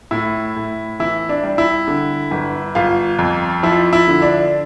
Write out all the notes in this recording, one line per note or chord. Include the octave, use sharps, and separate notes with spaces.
A2 E4
A2
E3 E4
D4
G3
E4
D3
G1
G1 F4
F2
F3 E4
E4
D3
D4